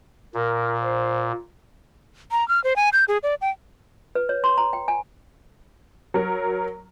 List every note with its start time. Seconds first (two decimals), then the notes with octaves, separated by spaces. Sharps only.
0.34 A#2 A#4
0.80 C5
2.32 A#5
2.48 F6
2.64 C5
2.76 G#5
2.93 G6
3.08 G#4
3.23 D5
3.41 G5
4.15 B4
4.29 C#5
4.44 C6
4.58 A#5
4.73 G5
4.88 G#5
6.14 F#3 A#4